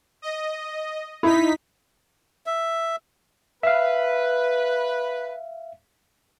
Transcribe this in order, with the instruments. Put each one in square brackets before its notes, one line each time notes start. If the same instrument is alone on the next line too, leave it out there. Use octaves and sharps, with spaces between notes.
[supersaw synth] D#5
[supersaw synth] D#4 B6 [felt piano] E4
[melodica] E5
[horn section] B4 [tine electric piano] E5 F5